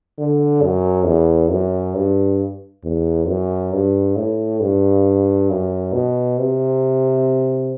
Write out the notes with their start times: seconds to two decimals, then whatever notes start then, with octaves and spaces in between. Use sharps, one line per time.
0.18 D3
0.63 F#2
1.06 E2
1.51 F#2
1.96 G2
2.84 E2
3.28 F#2
3.73 G2
4.16 A2
4.61 G2
5.50 F#2
5.93 B2
6.39 C3